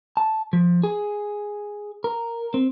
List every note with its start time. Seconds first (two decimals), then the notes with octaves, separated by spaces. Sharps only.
0.17 A5
0.53 F3
0.83 G#4
2.04 A#4
2.54 C4